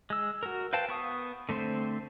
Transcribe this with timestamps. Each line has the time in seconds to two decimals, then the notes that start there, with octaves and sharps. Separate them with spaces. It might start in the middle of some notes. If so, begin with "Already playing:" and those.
0.10 G#3 E6
0.43 F#4 A#4
0.73 B4 C5 F5 G5 A5
0.89 B3 C#6 D#6
1.49 D3 A3 C4 C5